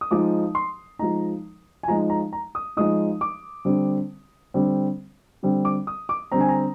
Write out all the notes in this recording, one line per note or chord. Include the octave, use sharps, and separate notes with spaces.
D#6
F3 G#3 D#4 D6
C6
F3 G#3 D#4 A#5
G#5
F3 G#3 D#4 A#5
A#5
A#5
D#6
F3 G#3 D#4 D#6
D6
D3 G3 C4
D3 G3 C4
D3 G3 C4
D6
D#6
D6
D3 G3 C4 A#5
G#5
A#5